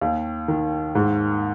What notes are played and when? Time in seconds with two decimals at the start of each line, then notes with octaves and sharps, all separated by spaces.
0.01 D#2
0.48 D#3
0.95 G#2